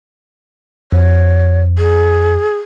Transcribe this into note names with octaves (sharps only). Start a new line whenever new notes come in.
F2 C#5
G#4